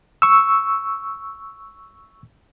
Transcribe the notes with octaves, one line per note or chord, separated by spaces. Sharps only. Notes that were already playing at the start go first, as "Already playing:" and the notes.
C#6 E6